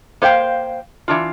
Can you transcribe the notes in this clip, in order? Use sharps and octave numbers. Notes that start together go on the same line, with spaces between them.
A#3 C5 F5 G5
E3 D4 F4